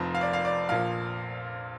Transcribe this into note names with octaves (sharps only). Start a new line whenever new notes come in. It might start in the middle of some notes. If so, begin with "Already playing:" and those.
Already playing: F1 F2 F3 C5
F5
D5
F5
D5
A#1 A#2 F3 F5